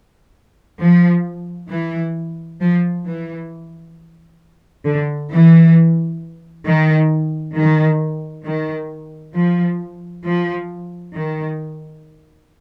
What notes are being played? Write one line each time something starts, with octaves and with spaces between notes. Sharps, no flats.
F3
E3
F3
E3
D3
E3
D#3
D#3
D#3
F3
F3
D#3